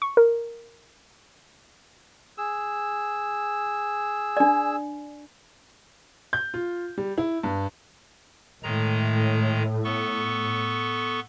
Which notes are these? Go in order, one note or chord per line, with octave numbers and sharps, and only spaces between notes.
C#6
A#4
G#4 E6
D4 D5
G6
F4
G3
E4
G2
A2 D#3 G#3 A#5
B3 A4 C#6